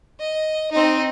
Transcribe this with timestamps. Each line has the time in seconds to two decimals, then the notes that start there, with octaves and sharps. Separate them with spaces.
0.19 D#5
0.72 C4 D#4